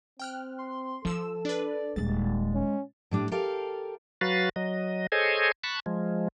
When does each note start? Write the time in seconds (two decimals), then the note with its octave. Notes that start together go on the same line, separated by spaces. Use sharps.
0.20 C4 G5 F6 F#6
0.58 C6
1.05 F3 F4 A4 E6 E7
1.45 D4 B4 D5
1.96 D#1 G#3 A#3 A6
2.54 C#4
3.11 A2 G3 D4
3.31 G4 A4 A#4 F5
4.21 F#3 F#4 B4 F5 A6
4.56 F#3 D#5
5.12 G#4 A4 C5 C#5 D#5 G#5
5.64 A5 B5 C#6 F#6
5.86 F3 G#3